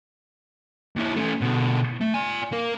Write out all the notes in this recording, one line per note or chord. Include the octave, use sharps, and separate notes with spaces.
D#2 E4
A3 C#4
B2 D3
A3
D5 G#5
A#3 A#4